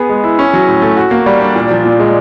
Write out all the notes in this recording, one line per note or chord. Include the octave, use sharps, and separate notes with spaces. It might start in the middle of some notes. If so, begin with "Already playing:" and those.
Already playing: B3 G#4
G#3
E4
C#4
F#3
A2
A3
F#4
A#3
G3
D4
A#2
F3
A#2
G#3